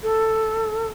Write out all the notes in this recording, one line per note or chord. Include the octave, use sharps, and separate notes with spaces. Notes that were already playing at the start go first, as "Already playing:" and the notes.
A4